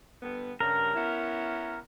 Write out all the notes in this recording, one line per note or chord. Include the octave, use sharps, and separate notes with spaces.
G2 D3 B3
G2 C#3 A#4
B3 C#4 E4